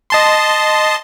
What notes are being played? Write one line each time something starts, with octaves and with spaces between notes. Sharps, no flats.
D#5 A5 C6